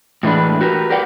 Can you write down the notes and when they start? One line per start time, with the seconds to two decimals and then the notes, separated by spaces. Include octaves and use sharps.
0.23 A2 E3 G#3 D4 B4
0.61 F#4 G4 A#4 B4
0.90 G4 A#4 B4 D5 F#5 G5